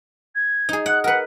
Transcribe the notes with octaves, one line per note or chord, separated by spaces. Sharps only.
G#6
D#4 G#4
F#5 F#6
A#4 B4 F#5